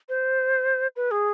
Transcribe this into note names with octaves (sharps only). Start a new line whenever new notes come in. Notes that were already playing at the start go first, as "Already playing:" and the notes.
C5
B4
G#4